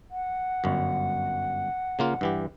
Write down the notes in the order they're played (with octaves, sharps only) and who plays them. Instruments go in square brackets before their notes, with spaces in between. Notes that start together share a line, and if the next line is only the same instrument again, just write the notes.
[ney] F#5
[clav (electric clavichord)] G1 F#2
C#3 A#3 F4
G2 E3 G4